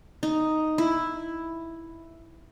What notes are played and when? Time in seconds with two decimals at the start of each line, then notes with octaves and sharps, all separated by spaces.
0.23 D#4
0.78 E4